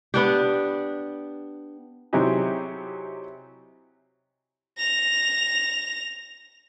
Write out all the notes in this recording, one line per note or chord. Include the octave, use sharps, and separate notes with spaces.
B3 D4 G4
C3 F#3 D#4 E4 G4 G#4
A#6 F7